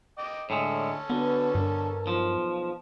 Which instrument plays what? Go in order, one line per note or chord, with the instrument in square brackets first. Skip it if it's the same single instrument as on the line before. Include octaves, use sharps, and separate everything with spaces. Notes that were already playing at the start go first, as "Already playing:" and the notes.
[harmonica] D#5 G5 D6
[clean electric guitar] A2 G#3 [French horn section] D3 [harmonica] C#4 A4
[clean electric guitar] D3 [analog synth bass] B3 [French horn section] F#4 B4
[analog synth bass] G2 [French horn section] B2 A#4
[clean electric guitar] B1 F3